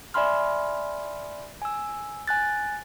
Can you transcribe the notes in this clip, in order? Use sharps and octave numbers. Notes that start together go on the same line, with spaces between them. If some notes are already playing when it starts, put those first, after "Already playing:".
D5 E5 G#5 B5 C6 F6
G#5 E6
G#5 F#6 A6